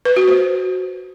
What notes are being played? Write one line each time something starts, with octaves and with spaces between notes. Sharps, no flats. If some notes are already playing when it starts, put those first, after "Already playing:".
B4
F#4
C5